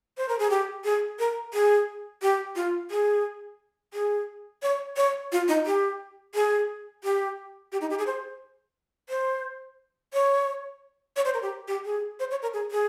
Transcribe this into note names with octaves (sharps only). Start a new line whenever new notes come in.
C5
A#4
G#4
G4
G#4
A#4
G#4
G4
F4
G#4
G#4
C#5
C#5
F4
D#4
G4
G#4
G4
G4
D#4
G4
G#4
C5
C5
C#5
C#5
C5
A#4
G4
G4
G#4
C5
C#5
A#4
G#4
G#4